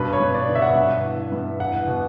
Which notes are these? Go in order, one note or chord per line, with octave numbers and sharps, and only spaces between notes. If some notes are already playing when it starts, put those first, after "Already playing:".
Already playing: G2 B2 B4
C#5
G2
D5
D3
E5
F#5
G2 E5
E3
G2
E2 F#5
B2